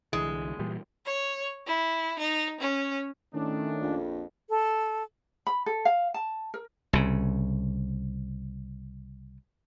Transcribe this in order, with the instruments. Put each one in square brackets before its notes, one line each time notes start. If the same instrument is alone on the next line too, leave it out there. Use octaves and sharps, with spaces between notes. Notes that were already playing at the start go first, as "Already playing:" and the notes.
[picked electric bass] C2 D3 E3 [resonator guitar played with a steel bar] G#3
[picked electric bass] A#2 E3 G3
[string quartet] C#5
E4
D#4
C#4
[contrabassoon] A2 [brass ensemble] D#3 A3 [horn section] C#4 D4
[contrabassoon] A#1 [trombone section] F2
[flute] A4
[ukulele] B5
A4
F5
A5
A#4
[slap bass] C2 C#3